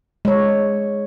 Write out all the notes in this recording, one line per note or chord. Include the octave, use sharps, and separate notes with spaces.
G#3 C#5